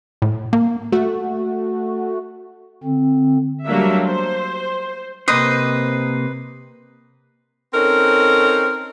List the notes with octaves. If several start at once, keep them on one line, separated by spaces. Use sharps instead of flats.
A2
A#3
A3 F#4
D3 C4
F#3 G3 A3 A#3 D4 E5
C5
C3 A#3 B4 C5 D#5
C4 C#4 D#4 A4 A#4